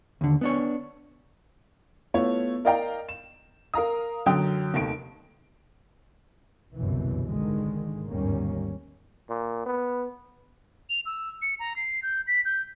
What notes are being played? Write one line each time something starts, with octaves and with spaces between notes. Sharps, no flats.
D#2 D3
B3 D4 C#5
A3 B3 E4 F4 C#5
A#4 D5 D#5 F5 G5 A#5
E7
A#4 F5 A#5 D#6
F#2 D3 F#3 G5 D#6
F1 D#2 D7
G1 C2 F#2 B2 E3
G#1 D3 D#3 G#3
G1 D#2 G#2 G3 A#3 C#4
A#2
B3
F7
E6
C#7
A#5
C7
G6
B6
G6